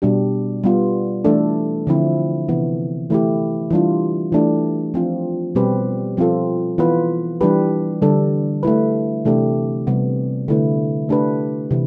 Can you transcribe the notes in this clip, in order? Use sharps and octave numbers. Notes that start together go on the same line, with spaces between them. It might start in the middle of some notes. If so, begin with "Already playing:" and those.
B2 G3 D4 G4
G3 B3 F4
E3 A3 D4 A4
D3 F3 C4 E4
C3 E3 B3
E3 A3 E4 G4
E3 G3 D4 F4
E3 A3 D4 G4
F3 C4 F4
B2 G3 C4 G4 B4
F3 C4 F4 A4
E3 B3 F4 B4
E3 G3 D4 G4 B4
D3 G3 D4 A4
A3 E4 B4
C3 E3 A3 D4 G4
C3 G3 B3
D3 A3 E4 B4
A3 D4 G4 B4
C3 E3